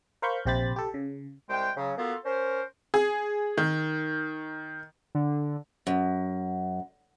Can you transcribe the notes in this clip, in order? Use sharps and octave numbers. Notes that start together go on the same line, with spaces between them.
A#4 C5 F5 B5 C#6 G6
A#1 C3 G4 C5 B5 A6
G4 A4
C#3
C2 G#3 G5
C#3 F#3
A#3 B3 F4 F#4 A4
C#4 A#4 C5
G#4
D#3
D3
F#2